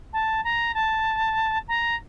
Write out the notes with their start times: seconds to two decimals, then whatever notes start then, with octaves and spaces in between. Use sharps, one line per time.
0.13 A5
0.44 A#5
0.74 A5
1.68 A#5